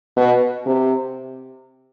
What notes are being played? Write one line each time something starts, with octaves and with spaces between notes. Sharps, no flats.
B2
C3